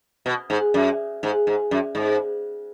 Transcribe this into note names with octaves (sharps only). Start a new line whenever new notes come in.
B2
G#2
F#2
G#2
G#2
F#2
G#2